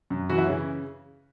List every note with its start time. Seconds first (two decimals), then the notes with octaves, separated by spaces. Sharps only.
0.10 F#2
0.30 E3 F#4
0.38 E4
0.47 C#3 C#4